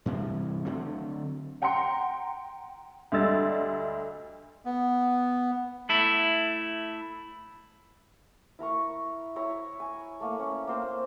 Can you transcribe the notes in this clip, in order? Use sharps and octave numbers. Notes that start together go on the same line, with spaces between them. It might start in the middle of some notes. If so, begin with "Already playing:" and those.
G2 C3 E3 F3
D3 F#3 A3 C4
F#5 G5 A#5 C6 C#7
D2 G3 D#5 E6 A6
B3
A3 E4
E4 A#4 A#5 C#6
E4 C#5 A#5 E6
G#5
A3 A#3
C#4
A#3 C4 C5